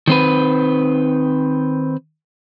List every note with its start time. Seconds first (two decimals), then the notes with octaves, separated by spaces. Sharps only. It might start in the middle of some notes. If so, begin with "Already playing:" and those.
0.07 D#3 C4 B4